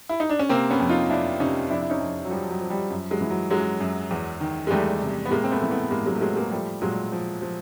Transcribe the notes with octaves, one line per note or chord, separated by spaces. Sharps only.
E4
D#4
D4
C#4
C3 A#3 C4
B3 C#4
F2
D#4 F4
F2 D4 E4
C3 C#4 D#4
F2 D4 E4
E4
C#4 D#4
F2
F#3
F3 G3
F#3
F3
G3
F#2
F#3 G#3
E3
F#3
F#2 F#3 G#3
F#2
E2
D#3
G#3
E2 G3 A3
C3
B3
A2 G#3 A#3
C4
A3 B3
E3
A3 B3
A2 G#3 A#3
F#3 G#3
A3
A2 F#3 G#3
G#3 A#3
F3 G3 A3
A#2 F#3 G#3
F3
F3